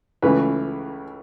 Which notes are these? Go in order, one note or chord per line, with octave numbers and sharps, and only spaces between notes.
C#2 C#3 E3 A3 B4